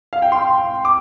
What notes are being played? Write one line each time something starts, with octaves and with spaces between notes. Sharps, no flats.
F5
G5
C6
D6